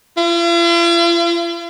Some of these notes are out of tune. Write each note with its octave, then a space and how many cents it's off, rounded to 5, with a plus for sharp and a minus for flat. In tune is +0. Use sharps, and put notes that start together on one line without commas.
F4 -45